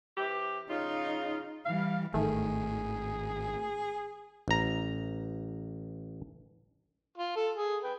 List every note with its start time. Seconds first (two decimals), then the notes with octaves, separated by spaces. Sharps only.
0.17 E3 C4 G4
0.70 C#3 D#4 F4
1.66 E3 G3 F5
2.14 G#1 A2 D#3 A3 G#4
4.48 A1 A#5
7.18 F4
7.36 A4
7.58 G#4
7.84 B4 G5